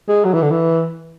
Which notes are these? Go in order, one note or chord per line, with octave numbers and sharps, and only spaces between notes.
G#3
F#3
E3
D3
E3